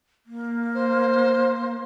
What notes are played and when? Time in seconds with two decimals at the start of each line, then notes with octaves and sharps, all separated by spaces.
0.26 A#3
0.74 C5